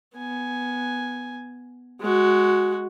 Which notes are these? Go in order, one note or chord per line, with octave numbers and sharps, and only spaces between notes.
B3 G#5
G#3 F#4